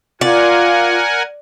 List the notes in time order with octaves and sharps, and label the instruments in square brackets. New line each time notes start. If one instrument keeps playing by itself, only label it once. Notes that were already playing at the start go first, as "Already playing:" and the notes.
[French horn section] F4 [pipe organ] A#4 F#5 G#5 [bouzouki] D5